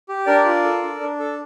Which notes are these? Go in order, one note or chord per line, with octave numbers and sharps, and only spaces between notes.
G4
D4 A#4 D5
F4
A4
D4
D4
A4